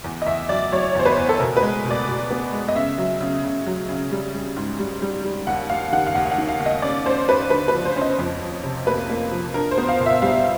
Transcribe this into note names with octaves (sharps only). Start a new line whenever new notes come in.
E2
D#5
E2 E5
F#3 D5
F#3 C#5
E2 C5
B4
E2
A4
B2 A#4
B4
G#3
B2
D5
B2
B3
G#3
D#5
C#3 E5
F#3
C#3
C#3
F#3
C#3
G3
G3
G#2
G3
G3
G3
D#2 F#5
D#2 F5
D#3 F#5
F5
D#2 F#5
F5
F#5
D#3
F5
D#2
D#5
C#4 D5
C#4 C5
C#4 B4
D3 B4
B4
F3
C5
C#4
D#5
F2
F3
C3
A#3 B4
A#3
F3
D4 A#4
C5
B3
F5
A#2
E5
G3 F5